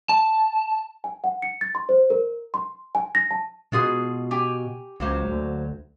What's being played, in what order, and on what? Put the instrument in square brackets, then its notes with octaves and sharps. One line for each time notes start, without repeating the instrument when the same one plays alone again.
[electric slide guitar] A5
[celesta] G#5
F#5
C#7
A6
C6
C5
A#4
C6
G#5
A#6
A5
[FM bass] B2 [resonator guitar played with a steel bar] G#3 F4 G#4
[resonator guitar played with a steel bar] G4 G5 G#5
[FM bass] C#2 [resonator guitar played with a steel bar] F#3 A#3 C5
[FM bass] D2